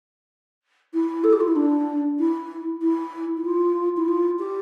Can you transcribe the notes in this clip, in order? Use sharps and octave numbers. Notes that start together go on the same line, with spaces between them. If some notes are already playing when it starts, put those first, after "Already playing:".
E4
A4
G4
F4
E4
D4
E4
E4
E4
F4
E4
F4
G4